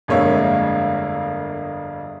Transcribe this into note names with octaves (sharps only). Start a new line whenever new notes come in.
G1 F2 G#3 A#3 C#5 E5